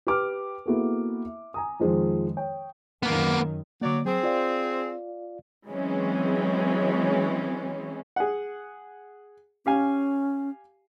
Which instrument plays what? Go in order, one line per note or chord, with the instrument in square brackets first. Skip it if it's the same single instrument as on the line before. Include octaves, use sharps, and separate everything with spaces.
[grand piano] G4 B4 D6 F6
A#3 B3 E4 F#4 G#4 A4
E5
G#5 A#5 D#6
F2 D#3 F3 G#3
C#5 G5
[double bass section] F#2 D#3 [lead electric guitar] A#3 B3
[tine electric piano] D3 A#3 [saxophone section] F#3 D5
[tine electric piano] F#3 [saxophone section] C4 G#4
[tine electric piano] F4 D5 F5
[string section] E3 F#3 G#3 C4 C#4
[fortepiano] G#4 F#5
[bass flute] C#4 [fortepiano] G4 F5 G#5